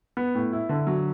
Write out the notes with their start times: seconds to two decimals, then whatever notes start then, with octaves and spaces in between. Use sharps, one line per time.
0.17 B3
0.35 A2
0.53 E4
0.69 D3
0.87 F#3